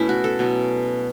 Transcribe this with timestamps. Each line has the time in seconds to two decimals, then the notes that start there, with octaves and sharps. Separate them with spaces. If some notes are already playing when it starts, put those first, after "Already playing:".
Already playing: B2 A3 C#4 E4
0.09 F#4
0.24 A4
0.39 B2 F#3 C#4